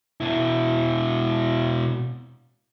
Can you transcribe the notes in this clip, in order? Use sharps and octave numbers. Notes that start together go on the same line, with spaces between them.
B2 E4